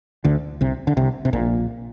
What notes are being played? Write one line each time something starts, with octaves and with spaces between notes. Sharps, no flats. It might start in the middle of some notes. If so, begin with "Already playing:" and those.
D2 D3
C2 C3
D3
C2 C3
C3
A#1 A#2